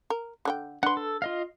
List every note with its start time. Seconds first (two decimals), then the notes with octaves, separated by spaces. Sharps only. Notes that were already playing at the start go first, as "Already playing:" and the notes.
0.10 A#4
0.45 D3 D4 G5
0.83 D4 B4 F#5 C6
0.97 A4
1.22 F4 D#5 F5